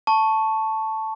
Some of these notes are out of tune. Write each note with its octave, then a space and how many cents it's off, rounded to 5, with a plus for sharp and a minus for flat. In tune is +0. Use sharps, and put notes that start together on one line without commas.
A5 +0 C#6 +0